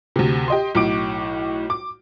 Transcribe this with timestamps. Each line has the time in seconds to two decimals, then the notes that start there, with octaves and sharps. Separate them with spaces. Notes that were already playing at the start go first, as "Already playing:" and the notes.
0.16 D2 C3
0.48 G4 D#5 C6
0.75 B1 A2 D6 D7
1.70 D6